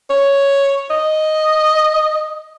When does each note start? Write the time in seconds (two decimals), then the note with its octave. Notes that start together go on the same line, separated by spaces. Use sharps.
0.10 C#5
0.91 D#5